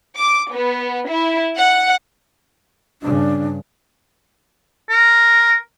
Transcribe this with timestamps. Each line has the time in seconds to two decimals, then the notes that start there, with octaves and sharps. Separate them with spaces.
0.17 D6
0.52 B3
1.09 E4
1.57 F#5
3.02 G2 C#3 D4
4.90 A#4